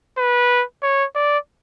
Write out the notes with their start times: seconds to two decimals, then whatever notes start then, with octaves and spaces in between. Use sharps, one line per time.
0.18 B4
0.82 C#5
1.15 D5